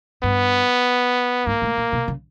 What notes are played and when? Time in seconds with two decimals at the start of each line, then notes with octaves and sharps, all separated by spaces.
0.23 G2 B3
1.46 G#2 A#3
1.62 A2
1.77 A#2
1.93 B2
2.08 C#3